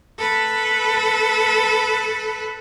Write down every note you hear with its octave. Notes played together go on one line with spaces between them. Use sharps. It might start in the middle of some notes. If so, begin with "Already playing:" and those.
A4 B4